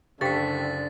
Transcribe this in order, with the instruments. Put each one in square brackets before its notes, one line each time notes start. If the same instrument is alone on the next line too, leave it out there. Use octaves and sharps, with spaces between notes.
[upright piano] F#1 [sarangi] D3 [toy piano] G4 F5 G5 [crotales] A6 B6